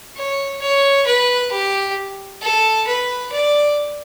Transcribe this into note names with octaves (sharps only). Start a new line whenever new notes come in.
C#5
C#5
B4
G4
A4
B4
D5